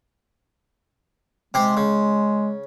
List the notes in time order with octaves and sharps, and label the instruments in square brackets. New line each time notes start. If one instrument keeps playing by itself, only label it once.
[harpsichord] C3 G4 C5 [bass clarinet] G#3
[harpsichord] C#3